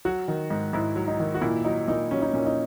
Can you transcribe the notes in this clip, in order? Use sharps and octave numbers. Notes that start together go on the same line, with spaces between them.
F#3 F#4
D#3
G#2
G#2 E4
F#3
D#4
D#3
F#4
A#2 E4
F#3 D#4
A#2 D#4
F#3 C#4
D#4
A#2 C#4
D#4